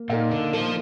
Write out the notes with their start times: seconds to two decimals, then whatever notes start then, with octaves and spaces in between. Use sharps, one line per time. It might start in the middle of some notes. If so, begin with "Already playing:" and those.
Already playing: A#3
0.10 A#2 D#4 A#4 F5
0.31 D3
0.53 F3 A#3